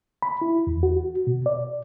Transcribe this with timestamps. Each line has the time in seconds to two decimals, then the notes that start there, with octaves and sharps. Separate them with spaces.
0.22 B5
0.42 E4
0.67 E2
0.83 F#4
1.27 B2
1.46 D5